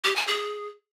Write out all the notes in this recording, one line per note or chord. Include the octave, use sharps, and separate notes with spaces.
G4
G#5
G#4